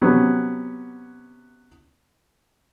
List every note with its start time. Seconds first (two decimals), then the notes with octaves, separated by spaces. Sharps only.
0.02 C3 F#3 B3 C#4